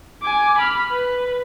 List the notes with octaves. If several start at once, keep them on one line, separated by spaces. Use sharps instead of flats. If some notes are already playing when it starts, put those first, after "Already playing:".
G#5 D6
B5 F6
B4